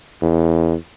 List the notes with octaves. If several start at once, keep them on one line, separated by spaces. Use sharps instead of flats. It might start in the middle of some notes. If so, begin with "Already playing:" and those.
E2